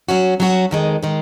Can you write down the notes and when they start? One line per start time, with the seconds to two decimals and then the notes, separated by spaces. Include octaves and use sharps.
0.09 F#3 C#4 F#4
0.40 F#3 C#4 F#4
0.71 F2 D#3 G#3
1.03 D#3 G#3